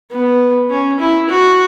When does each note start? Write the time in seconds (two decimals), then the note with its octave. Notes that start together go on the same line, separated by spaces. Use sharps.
0.11 B3
0.70 C#4
0.99 E4
1.29 F#4